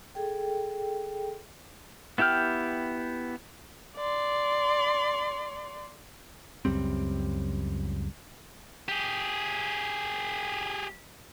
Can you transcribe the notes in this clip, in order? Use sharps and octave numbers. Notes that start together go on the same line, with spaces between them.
G#4 A4 G5
B3 E4 G4 G5 F6
D5 C6
C#2 F#2 G3 C4
G4 G#4